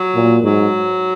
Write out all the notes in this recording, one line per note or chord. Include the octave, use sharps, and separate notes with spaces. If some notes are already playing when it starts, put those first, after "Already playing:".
Already playing: F#3
A#2
G#2 F#3